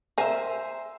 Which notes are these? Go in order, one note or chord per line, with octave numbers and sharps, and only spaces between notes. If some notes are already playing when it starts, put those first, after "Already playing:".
A#4 C5 E5 G#5